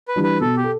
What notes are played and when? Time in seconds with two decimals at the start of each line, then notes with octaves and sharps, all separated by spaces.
0.08 B4
0.16 E3 G3 D4
0.23 B4
0.41 B2 A4
0.57 G4
0.64 A4